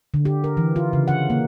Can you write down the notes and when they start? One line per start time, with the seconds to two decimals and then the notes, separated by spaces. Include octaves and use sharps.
0.14 D3
0.25 G4
0.44 A#4
0.57 E3
0.76 F4
0.93 C#3
1.08 F#5
1.30 A#3